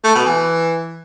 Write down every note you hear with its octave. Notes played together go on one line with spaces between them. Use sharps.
A3
B2
E3